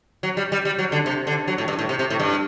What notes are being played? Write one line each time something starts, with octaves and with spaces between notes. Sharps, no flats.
F#3
G3
G3
G3
F#3
D3
C3
D3
F#3
A2
G2
A2
C3
C3
A2
G2